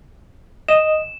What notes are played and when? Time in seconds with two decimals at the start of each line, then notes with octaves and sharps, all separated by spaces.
0.69 D#5 E7